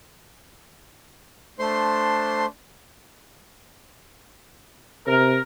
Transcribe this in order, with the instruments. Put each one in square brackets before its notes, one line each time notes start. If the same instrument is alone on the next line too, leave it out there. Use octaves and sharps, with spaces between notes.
[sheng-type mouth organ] A3 C5 C6 [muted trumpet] D4
[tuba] C3 [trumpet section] A#4